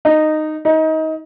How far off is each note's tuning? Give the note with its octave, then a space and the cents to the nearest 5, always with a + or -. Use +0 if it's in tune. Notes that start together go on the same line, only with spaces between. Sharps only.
D#4 -10
D#4 +25